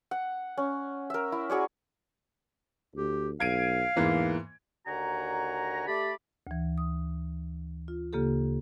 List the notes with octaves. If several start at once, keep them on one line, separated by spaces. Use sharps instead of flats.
F#5
C#4
A#4 E5
E4
F#4 G#4 C#5 D5
D2 G4
B1 F5 G#6 D7 D#7
E2 G#2 E3 A#3
D#2 D3 F#4 F#5 G#5 A#5
A3 G4 D5 B5
D2 E3
D#6
F4
D2 C#3 A#3 G4 A4